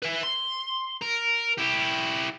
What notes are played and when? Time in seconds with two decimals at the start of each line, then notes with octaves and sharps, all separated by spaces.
0.03 B4 E5
0.23 C6
1.01 A#4
1.57 E4 G4